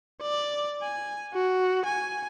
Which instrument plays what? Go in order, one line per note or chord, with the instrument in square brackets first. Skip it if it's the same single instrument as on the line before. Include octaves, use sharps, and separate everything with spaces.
[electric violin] D5
G#5
F#4
G#5